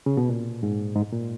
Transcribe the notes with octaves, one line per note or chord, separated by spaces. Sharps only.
C#3
B2
A#2
G#2
G#2
A#2